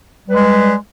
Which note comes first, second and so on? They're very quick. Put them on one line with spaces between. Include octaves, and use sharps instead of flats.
G3 B4 G#3